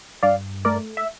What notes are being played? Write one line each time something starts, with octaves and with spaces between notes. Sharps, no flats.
G2 D5 F5
A3 A#4 D5
E5